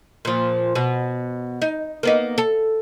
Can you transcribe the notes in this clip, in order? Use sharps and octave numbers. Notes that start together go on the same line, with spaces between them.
A#2 F3
B2
D#4
A#3 B3 D#4
A4